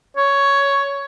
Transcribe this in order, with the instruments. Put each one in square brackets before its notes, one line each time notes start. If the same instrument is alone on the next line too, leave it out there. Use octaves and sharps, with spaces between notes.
[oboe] C#5